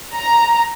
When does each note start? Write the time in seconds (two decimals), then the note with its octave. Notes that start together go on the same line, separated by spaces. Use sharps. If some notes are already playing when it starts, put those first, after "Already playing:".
0.14 A#5